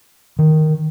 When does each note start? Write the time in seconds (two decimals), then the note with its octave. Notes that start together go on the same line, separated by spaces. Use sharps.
0.39 D#3